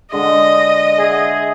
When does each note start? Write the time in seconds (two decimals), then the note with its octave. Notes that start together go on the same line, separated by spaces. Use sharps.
0.13 D3 G#3 D#5
0.99 G#4 E5 F#5